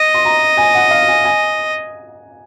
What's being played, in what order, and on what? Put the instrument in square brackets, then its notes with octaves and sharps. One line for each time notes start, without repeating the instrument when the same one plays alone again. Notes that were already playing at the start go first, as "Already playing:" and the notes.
Already playing: [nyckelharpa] D#5
[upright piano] C6
A#5
G#5
F#5
F5
G#5
G#5